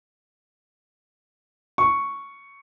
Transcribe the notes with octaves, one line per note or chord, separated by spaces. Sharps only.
C#6